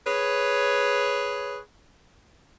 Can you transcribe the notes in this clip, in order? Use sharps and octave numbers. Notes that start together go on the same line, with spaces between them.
G#4 B4 C#5